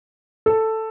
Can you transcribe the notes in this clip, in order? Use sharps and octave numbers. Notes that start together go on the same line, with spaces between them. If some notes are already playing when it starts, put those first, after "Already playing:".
A4